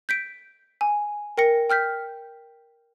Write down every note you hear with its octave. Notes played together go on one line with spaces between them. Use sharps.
G6 B6 D7
G#5
A#4 G5 A#6 C#7
G5 F6 G6 B6